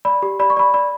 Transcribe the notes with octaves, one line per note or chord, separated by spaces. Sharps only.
D5 B5
G4
D5 B5
C#6
D5 B5
D5 B5